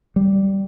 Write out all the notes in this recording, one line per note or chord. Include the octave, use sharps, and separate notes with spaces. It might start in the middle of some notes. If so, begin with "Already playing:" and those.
G3